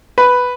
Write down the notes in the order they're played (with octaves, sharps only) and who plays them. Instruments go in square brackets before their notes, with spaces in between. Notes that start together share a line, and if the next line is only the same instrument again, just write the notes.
[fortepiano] B4